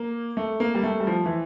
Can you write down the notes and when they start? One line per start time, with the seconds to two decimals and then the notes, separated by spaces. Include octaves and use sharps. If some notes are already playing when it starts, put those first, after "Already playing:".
Already playing: A#3
0.37 A3
0.60 A#3
0.75 G3
0.83 A3
1.00 G3
1.07 F3
1.26 E3